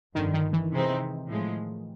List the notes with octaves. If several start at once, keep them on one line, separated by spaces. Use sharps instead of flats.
G1 F2 D3 D#3
D#3
E3
C3 E3 G#3 C4 D#4
A2 F3 G#3